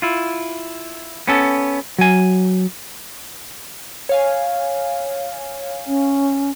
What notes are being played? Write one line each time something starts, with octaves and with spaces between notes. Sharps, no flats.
E4 F4
B3 C#4 A4
F#3 G#5
C#5 F5 G#5
C#4